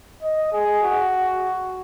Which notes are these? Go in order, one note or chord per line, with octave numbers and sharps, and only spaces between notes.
D#5
G#4
F#4